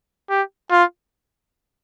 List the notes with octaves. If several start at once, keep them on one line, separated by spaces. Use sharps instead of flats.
G4
F4